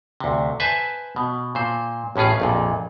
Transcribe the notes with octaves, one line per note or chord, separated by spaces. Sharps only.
D2 C3
B4 C5 E5 G#5 A5
B2
A#2 C5
A1 A2 C#4 F4 G#4
A#1 F2 A#2